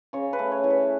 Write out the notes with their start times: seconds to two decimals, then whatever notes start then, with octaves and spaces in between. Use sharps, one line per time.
0.13 C#3 C#5
0.33 B4
0.39 A3
0.52 C#5
0.64 E3
0.70 B4